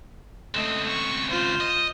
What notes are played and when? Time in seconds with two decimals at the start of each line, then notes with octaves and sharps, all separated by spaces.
0.54 C#2 A3 C4 D#5
0.88 C#6
1.30 F4 C5
1.61 D#5